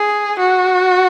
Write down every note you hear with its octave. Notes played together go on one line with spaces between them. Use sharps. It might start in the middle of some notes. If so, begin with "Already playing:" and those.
Already playing: G#4
F#4